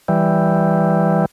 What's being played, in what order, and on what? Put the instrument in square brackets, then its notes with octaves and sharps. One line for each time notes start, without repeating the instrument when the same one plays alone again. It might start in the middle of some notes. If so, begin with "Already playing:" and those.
[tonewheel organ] E3 G3